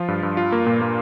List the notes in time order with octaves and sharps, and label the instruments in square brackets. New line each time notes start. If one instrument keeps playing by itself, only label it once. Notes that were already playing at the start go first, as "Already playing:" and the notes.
Already playing: [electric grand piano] F3 F4
G2
G2
F4
A#3
A#2
A#3